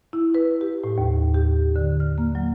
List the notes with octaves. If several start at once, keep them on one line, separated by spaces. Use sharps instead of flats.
E4
B4
G4
A2
D#2
G4
D3
F6
A#3
F#3